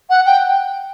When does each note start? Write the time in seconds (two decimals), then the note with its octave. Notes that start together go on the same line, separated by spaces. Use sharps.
0.09 F#5
0.25 G5